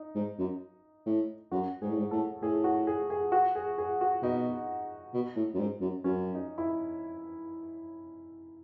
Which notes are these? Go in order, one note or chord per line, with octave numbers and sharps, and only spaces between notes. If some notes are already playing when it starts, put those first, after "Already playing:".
Already playing: D#4
G#2
F#2
A2
F#2 F#4
G#2 G#4
A2
G#2
A2 A4
A2 G#4
F#4
G#4
G#4
F#4
G#4
G#4
F#4
B2 D#4
B2
A2
F#2
G#2
F#2
F#2 C#4
D#4
E4